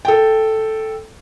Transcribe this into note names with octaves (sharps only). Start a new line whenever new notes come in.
A4 G5